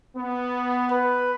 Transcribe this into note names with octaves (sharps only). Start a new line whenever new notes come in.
B3
B4